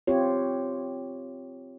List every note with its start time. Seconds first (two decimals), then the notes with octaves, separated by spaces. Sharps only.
0.07 C4 F4 G4 C#5